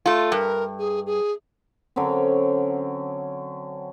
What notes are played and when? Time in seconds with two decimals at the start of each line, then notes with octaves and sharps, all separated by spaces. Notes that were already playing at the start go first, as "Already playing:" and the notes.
0.06 A3 F4
0.32 G2 A#4
0.78 G#4
1.05 G#4
1.96 D3 F#3 C4 C#4